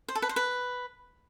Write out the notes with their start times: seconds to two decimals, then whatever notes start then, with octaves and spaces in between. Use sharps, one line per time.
0.08 C5
0.15 A4
0.22 B4
0.29 C5
0.36 B4